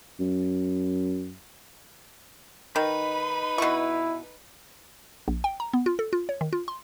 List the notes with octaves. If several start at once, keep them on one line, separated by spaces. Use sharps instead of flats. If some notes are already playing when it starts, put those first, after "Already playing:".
F#2
D#3 D#4 B4 B5
B2 E4 C#6
A#1
G5
A#5
B3
F4
A4
F4
C#5
D#3
F4
C6